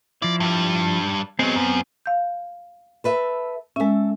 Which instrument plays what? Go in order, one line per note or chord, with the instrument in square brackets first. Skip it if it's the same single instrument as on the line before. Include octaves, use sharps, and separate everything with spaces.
[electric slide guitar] F3 E4 [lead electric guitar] D5
[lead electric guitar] G2 G3
[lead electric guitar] F#3 G#3 [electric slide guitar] B3 C4
[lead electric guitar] F#2
[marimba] F5 G6
[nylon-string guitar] A4 B4 E5
[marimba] G#3 C#4 [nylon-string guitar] A4 E5